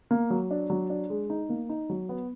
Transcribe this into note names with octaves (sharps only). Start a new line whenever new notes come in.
A#3
F#3
D4
F#3
D4
G#3
D#4
A#3
D#4
F#3
B3